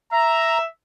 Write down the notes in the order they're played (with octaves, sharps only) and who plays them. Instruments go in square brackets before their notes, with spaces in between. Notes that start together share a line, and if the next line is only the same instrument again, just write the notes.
[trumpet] E5 [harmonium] A#5